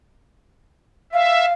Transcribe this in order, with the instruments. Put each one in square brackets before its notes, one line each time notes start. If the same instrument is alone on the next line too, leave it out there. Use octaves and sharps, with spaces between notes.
[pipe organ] E5 [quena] F5